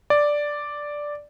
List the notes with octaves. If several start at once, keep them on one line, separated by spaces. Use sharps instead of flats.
D5